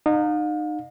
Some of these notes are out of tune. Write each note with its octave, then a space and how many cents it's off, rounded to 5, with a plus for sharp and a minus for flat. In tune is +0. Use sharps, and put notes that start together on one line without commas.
D#4 -30 F5 +40